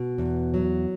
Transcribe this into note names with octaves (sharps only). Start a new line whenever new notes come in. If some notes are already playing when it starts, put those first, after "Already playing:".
Already playing: B2
E2
F#3